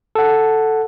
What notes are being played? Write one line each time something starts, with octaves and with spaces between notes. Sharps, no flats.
A4 F#5